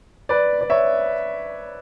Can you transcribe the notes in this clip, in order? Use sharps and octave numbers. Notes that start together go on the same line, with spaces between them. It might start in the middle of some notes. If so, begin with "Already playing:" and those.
B4 D5
D5
C#5 E5